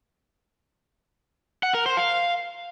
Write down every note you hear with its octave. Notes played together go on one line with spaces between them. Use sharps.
F#5
A#4
C5
F5